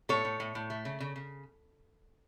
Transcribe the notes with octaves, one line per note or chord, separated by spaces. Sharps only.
A2 A4 C#5
A2
A2
A2
A3
C#3
C#3
C#3